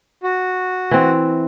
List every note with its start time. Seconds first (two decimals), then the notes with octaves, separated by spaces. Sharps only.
0.23 F#4
0.91 E3 C4